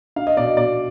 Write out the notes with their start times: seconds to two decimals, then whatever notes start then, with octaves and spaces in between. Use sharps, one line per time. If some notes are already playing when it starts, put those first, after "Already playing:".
0.16 D4 F5
0.27 D#5
0.37 B2 D5
0.47 D#5
0.57 B2 D5